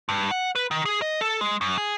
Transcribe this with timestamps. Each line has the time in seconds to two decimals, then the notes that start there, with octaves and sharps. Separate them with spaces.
0.09 G2
0.31 F#5
0.55 B4
0.71 D#3
0.85 G#4
1.02 D#5
1.21 A4
1.41 G#3
1.61 F#2
1.78 G#4